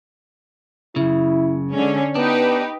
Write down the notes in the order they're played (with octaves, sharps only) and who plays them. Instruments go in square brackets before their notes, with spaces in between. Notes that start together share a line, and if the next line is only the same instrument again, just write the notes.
[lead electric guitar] F#2 C#3 [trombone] E4
[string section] D3 C#4 [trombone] G#3
[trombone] B3 [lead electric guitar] D4 [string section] D#4 G4 B4